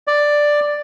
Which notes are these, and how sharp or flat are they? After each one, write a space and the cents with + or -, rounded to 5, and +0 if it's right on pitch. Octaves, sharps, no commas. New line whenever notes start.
D5 +5